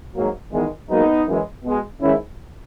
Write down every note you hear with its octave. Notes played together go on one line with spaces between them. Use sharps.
G#2 F#3 A#3
E2 D#3 G#3
G#2 F#3 A#3 B3 D#4
F#2 E3 G#3
B2 G#3
G#2 D#3 G#3 C#4 E4